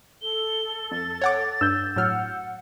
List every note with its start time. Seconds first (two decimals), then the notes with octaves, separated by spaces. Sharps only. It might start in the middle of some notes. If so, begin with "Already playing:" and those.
0.22 A4 G7
0.91 F2 A6
1.22 C#5 F#5 D6
1.61 G2 E6 G6
1.96 A2 F#3 F#5 F6